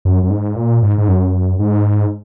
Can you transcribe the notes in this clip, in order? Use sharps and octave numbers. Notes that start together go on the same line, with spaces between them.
F#2
F#2
G#2
A#2
G#2
G#2
F#2
G#2